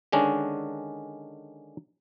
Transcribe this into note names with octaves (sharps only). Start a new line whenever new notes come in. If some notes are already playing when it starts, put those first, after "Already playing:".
D3 D#3 G#3 C#4 D4